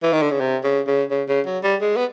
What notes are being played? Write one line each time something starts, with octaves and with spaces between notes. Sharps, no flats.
E3
D#3
D3
C#3
C3
C#3
C#3
C#3
C#3
F#3
G3
G#3
B3